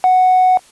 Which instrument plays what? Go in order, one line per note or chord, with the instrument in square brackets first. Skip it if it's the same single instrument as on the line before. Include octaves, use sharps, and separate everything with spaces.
[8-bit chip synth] F#5